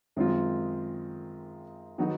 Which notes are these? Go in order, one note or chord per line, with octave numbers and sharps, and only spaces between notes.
F#2 D#3 G#3 C4 F4
D#3 F#3 B3 D#4 F#4